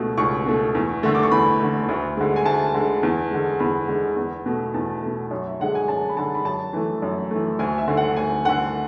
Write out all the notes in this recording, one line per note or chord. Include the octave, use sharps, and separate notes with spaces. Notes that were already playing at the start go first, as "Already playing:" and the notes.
Already playing: C#2 B2 A3
C#2 C#6
B2 A3
E2
D3 A3
D6
C#6
E2 B5
D3 A3
D2
D3 G#3
G#5
D2 A5
D3 G#3
E2
D3 G#3
E2 B5
D3 G#3
E2
B2 A3
E2 A5
B2 A3
F#2
E5
D3 G#3 F#5
G#5
F#2 A5
B5
D3 G#3 A5
B5
F#2 A5
E3 A3
F#2
E3 A3
D2 G#5
E5
D3 A3
F#5
D2 G#5
D3 A3 F#5